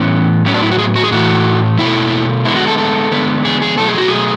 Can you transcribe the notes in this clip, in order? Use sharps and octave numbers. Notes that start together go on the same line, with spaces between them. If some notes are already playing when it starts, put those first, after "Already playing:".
Already playing: A2 E3 B3 C#4
A2 F#3 B3 C#4
D4
E4
F#4
G#4
F#4
G#4
A2 E3 A3 F#4
B2 A3 E4
D3 G#3 B3 E4
F#4
A4
A4
D3 G#3 B3
G#4
G#4
B2 F#3 A3 A4
G#4
F#4
G#4